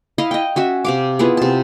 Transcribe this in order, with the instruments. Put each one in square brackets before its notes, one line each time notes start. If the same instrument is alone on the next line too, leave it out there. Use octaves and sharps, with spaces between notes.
[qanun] E4 D#5 F5
D#5 G5
C#4 F#4 E5
C3 F5 D6
B3 E4 F4 G#4
C3 A5